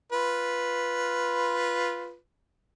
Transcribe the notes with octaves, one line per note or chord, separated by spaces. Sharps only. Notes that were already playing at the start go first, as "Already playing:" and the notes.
F4 B4